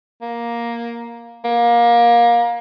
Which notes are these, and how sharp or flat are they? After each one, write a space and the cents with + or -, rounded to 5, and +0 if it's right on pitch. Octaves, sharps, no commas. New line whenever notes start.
A#3 +10
A#3 +25